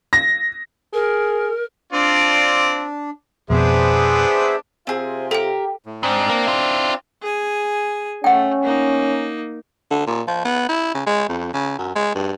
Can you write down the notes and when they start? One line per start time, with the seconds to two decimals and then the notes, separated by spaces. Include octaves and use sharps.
0.13 A#6
0.94 G#4 A#4
1.93 C4 D4 F4 D5
3.50 F2 B2 B3 D4 G#4 C5 E5
4.87 C3 C4 F4 G#4
5.31 G4 A4 A#4 G5
5.86 A2
6.03 G#2 C4 D4
6.30 A#3
6.47 E4 F4
7.22 G#4 G#5
8.24 A3 C#4 F#5 G5
8.63 A#3 D#4
9.91 D3
10.07 A#2
10.28 F3
10.45 B3
10.69 E4
10.94 C#3
11.06 G#3
11.29 F2
11.54 C#3
11.78 F#2
11.96 G#3
12.15 G2